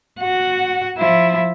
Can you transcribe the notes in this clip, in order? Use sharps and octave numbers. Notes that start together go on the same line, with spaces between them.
F#4 F#5
F3 E4